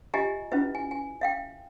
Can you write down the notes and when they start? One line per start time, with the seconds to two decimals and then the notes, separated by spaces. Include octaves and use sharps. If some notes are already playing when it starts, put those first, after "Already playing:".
0.14 F4 G4 D#5 E5 G#5 A#5
0.51 C#4 E4 F4 B4 E5
0.75 G#5
0.91 G#5
1.21 E5 F5 G5